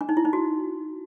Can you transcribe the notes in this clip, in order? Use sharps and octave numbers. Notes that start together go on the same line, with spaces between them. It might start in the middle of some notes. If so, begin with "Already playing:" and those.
D4
D#4
E4
D#4
F#4